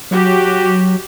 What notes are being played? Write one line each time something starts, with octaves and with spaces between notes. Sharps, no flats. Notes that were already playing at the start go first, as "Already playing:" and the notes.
F#3 F#4 G4